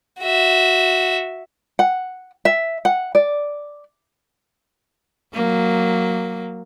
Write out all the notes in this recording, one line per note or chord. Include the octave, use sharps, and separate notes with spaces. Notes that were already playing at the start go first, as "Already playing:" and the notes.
F#4 E5
F#5
E5
F#5
D5
F#3 A#3